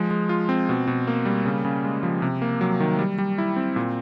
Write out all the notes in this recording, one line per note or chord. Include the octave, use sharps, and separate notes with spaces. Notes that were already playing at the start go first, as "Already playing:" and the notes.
Already playing: F3 G#3
G#3
F4
C4
B2
B2
A#3
G3
C#3
C#3
G#3
F3
C3
A#3
F#3
D#3
G3
G3
E4
C4
A#2